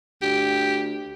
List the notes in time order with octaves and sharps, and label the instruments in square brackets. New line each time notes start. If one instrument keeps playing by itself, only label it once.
[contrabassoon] D2 [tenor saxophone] G4